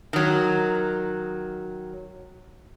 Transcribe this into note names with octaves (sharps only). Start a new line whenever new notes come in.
D#3 F#3